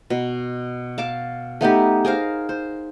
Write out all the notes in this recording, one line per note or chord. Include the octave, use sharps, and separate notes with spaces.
B2
F5 A5 D6
A3 B3 D#4 G4
G#4 A#4 C5 F5
C5